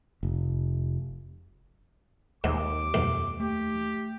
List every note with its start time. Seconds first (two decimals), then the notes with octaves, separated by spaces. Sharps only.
0.23 F1
2.44 D#2 G#2 D6
2.94 B1 F2 G#2
3.40 A3 G4